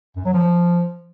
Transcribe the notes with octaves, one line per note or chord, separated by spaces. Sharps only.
F#2
F#3
F3